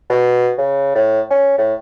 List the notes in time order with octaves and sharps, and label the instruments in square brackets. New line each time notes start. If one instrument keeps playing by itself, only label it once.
[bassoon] B2
C#3
A2
C#4
A2